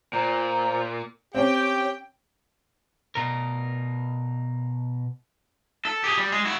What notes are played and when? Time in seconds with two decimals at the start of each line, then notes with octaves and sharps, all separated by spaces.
0.13 A#2 C5 A#5
1.35 C4 C#4 G4 G5
3.15 B2 A#4
5.85 A4
6.04 G4 G#4
6.18 G3
6.32 G#3 G#4
6.45 E4 F#4